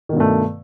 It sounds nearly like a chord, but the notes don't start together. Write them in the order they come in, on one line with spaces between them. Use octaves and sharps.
D#3 B2 G2 A3